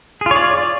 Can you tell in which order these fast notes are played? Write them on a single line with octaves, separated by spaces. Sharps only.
G#4 F4 C#5 D5